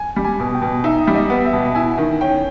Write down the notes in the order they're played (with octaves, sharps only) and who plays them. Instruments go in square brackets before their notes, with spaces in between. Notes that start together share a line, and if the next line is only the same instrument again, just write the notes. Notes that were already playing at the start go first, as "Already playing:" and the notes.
Already playing: [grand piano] G#5
[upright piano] G3
[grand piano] G#5
[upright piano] B2
[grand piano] G5
[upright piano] B2
[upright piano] D#4 [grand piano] E5
[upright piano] G3
[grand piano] D#5
[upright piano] B3
[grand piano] E5
[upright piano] B2
[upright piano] E4 [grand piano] G#5
[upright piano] D#3
[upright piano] C#4 [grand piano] G5